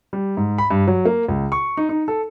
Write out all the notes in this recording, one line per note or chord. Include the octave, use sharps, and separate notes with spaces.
G3
G#2
B5
G2
F#3
A#3
C#2
C#6
D#4
D#4
A4